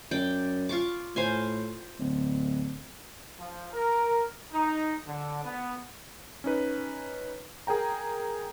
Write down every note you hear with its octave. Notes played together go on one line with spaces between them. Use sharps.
F#2 D5 G5
F4 C#6 D6
A2 C5 F5 G#5
D1
F3
A#4
D#4
D3
B3
C#4 D#4 B4
G#4 A#4 G5 A#5